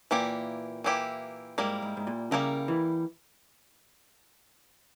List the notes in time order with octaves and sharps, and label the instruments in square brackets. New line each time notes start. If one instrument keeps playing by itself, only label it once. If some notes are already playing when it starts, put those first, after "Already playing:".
[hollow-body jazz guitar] A#2 [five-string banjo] E3 A#3 E4 G4
[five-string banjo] E3 A#3 E4 G4
[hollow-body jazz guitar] G#2 [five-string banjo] G3 A#3 E4 A#4
[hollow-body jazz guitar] G#2
G#2
A#2
[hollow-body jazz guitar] C#3 [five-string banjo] G3 A#3 E4 A#4
[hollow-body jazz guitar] E3